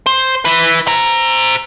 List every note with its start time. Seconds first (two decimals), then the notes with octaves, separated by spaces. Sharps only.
0.06 C5
0.45 E4 B4
0.87 C5 A#5